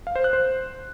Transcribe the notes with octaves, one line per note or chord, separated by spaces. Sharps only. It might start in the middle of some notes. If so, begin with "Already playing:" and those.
F5
C5
F#6
C5